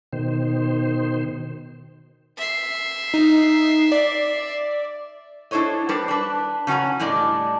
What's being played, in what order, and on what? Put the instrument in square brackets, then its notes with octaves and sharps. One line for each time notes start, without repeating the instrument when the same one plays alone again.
[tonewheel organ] B2 D#3 C5
[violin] E5 C7
[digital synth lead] D#4
D5
[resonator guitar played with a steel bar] D4 E4 A4 C5 C#5 D#5
G3 D4 B4 C5
D4 B4
C#3 C#4 F#4 G#5 A#5
A2 G3 D4 D5 D#5